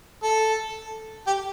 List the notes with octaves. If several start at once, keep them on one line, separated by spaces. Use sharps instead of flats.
A4
G4